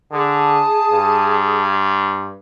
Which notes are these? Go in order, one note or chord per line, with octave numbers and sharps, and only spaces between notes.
D3 G#4 A5 D#6
G2